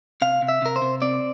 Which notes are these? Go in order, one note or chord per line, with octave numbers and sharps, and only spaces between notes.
C3 F5
C3
E5
C3 A#4
C5
C3
C4 D5